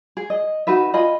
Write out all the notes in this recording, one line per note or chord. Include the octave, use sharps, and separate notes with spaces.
G#4
D#5
D#4 F#4 B4 E5
F4 D#5 G#5 B5